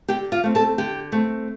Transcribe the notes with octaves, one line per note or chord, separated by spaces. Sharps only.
D3 G4 G5
F4 F5
A3 C4
A4 A5
D3 G4 G5
A3 C4